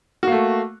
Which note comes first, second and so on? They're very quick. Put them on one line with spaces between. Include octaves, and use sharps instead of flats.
F#4 A#3 A3